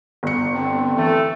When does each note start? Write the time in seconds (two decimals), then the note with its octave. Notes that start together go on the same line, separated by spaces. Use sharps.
0.23 G1 C#7
0.54 D3 C4
0.97 E3 A3